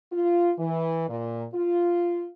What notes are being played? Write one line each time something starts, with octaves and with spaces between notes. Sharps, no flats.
F4
E3
A#2
F4